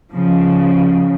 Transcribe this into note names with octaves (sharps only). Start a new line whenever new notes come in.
C#3 F3